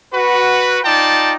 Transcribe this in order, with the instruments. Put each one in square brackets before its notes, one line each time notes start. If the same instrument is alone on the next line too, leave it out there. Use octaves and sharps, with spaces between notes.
[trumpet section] F#4 B4
D#4 F4 D5 G5 A5